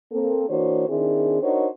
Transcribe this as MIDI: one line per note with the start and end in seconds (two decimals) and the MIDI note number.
0.12 0.46 58
0.12 0.46 60
0.12 0.46 69
0.49 0.86 52
0.49 0.86 58
0.49 0.86 62
0.49 0.86 66
0.49 0.86 72
0.49 0.86 73
0.89 1.41 51
0.89 1.41 60
0.89 1.41 62
0.89 1.41 64
0.89 1.41 68
1.43 1.67 62
1.43 1.67 63
1.43 1.67 66
1.43 1.67 70
1.43 1.67 72
1.43 1.67 73